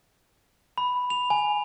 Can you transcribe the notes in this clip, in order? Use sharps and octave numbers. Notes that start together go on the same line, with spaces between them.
B5
F7
G#5